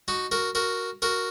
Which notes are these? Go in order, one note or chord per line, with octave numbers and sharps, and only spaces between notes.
D#4 F#4
F#4 A#4
F#4 A#4
F#4 A#4